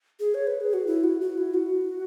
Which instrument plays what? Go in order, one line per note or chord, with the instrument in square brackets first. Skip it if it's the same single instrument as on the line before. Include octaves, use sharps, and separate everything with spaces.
[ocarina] G#4
C#5
B4
G#4
F#4
E4
F#4
F#4
E4
F#4